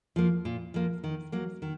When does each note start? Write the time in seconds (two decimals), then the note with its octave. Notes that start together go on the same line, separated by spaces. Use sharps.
0.16 F3 A#3
0.45 A#2
0.74 F3 A#3
1.04 D#3
1.32 F#3 A#3
1.62 D#3